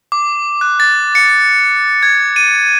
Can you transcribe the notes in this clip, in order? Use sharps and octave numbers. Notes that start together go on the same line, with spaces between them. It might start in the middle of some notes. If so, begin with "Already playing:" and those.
D6
F#6
A6
C#7
G#6
D#7